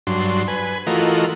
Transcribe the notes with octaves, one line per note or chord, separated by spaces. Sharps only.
G2 F#3 D4 C6
B4 G#5
E3 A3 F4 F#4 A#4 D#5